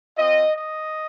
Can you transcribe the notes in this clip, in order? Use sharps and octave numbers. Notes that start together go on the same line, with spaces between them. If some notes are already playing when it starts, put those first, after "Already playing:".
C4 F4 D#5
D#5